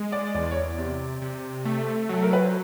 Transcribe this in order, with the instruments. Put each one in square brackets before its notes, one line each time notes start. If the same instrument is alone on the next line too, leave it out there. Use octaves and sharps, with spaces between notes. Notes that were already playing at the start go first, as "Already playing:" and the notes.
Already playing: [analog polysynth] G#3
[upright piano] D5
[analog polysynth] E2 [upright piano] D5
[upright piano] C#5
D5
[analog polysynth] C3
C3
A3
[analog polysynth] F#3 [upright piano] A4
[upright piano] A#4
B4
C5